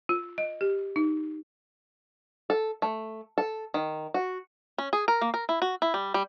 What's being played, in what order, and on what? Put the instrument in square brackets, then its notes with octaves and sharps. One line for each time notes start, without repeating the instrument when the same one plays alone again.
[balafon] F4
D#5
G4
D#4
[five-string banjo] A4
A3
A4
D#3
F#4
C#4
G#4
A#4
A#3
A#4
E4
F#4
E4
G3
G3